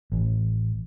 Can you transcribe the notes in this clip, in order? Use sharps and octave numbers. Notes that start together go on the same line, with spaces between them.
A1